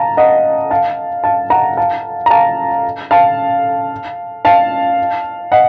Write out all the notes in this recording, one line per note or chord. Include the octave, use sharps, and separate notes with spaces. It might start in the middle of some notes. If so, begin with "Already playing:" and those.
Already playing: F5 A5 A#5
D#5 F#5
F5 A5
F5 A5
F#5 A#5
F5 A5
A#5
F5 A5
F5 A5
F5 A5
D#5 F#5